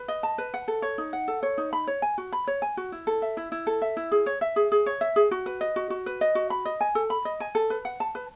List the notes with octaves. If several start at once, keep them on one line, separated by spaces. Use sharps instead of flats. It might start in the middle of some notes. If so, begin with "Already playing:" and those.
Already playing: B4
D#5
A5
B4
F#5
A4
C#5
D#4
F#5
A4
C#5
D#4
B5
C#5
G#5
F#4
B5
C#5
G#5
F#4
E4
A4
E5
E4
E4
A4
E5
E4
G#4
C#5
E5
G#4
G#4
C#5
E5
G#4
F#4
B4
D#5
F#4
F#4
B4
D#5
F#4
B5
D#5
G#5
A4
B5
D#5
G#5
A4
B4
F#5
A5
B4